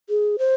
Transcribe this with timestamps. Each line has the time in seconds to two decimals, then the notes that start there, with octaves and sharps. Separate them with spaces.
0.09 G#4
0.39 C5